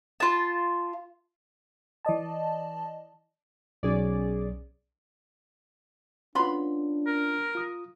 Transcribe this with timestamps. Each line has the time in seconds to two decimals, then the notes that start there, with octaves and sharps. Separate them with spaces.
0.20 F4 A5
2.05 E3 D5 D#5 A5
3.83 B1 C#4 G#4 D5
6.35 B3 C#4 D4 F4 B5 C6
7.06 A#4
7.55 F4 D#6